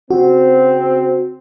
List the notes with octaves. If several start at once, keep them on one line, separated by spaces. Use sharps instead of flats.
C#3 C4 F#4